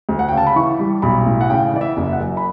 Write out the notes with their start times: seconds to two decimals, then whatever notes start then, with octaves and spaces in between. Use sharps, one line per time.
0.09 D2
0.19 F#5
0.28 C#3 G5
0.37 A5
0.47 B5
0.56 E3 C#6
0.79 G3
1.02 B1 B5
1.26 A2
1.41 F#5
1.50 C#3 G5
1.74 E3 D5
1.81 E5
1.97 F#1
2.04 E5
2.13 F#5
2.21 F#2
2.37 B5